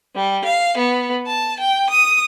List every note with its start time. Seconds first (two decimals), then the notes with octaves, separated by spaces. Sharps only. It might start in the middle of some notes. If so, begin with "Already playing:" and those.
0.14 G3
0.44 F5
0.77 B3
1.26 A5
1.58 G5
1.89 D#6